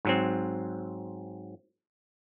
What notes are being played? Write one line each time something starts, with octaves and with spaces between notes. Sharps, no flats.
G#2 F#3 C4